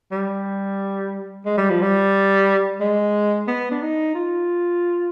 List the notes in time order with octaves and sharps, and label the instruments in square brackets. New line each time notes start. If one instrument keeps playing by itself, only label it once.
[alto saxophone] G3
G#3
G3
F3
G3
G#3
B3
D4
D#4
F4